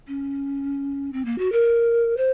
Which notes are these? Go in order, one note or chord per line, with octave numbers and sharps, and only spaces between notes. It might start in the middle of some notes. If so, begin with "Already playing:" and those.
C#4
C4
A#3
F#4
A#4
C5